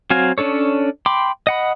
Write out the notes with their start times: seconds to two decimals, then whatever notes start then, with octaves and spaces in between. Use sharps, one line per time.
0.10 F#3 C4 F#4 F5 G#5
0.38 C#4 D4 A4 C#5
1.06 G5 B5 C6 D6
1.47 D#5 F#5 B5